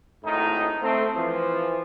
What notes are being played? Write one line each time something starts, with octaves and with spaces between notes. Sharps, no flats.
G#1 A2 D#3 D#4
A3 C4
E3 F3